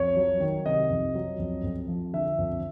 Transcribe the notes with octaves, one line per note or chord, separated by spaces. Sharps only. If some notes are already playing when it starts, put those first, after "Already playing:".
Already playing: F2 C#5
F#3
D#3
C3 D#5
F2
F#3
F2
F2
F3
D3 E5
F2